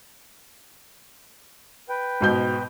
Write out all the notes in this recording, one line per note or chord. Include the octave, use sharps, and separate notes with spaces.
B4 G5
G#2 B2 G6